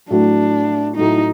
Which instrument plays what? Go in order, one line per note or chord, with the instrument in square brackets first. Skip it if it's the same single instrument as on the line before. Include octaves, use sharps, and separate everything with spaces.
[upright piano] A2 F#3 A3 [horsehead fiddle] D4
[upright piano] A2 F#3 A3 [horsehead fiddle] D#4